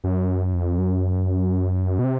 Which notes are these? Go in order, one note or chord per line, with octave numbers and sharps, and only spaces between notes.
F#2
F2
F#2
B2
C3